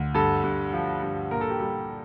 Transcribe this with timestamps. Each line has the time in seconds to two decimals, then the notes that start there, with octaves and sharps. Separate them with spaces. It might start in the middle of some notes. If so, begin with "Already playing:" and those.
Already playing: D2
0.14 G2 A4
0.44 G2
0.73 F3
1.03 G2
1.31 A#2 A#4
1.41 A4
1.50 G4
1.60 G3 A4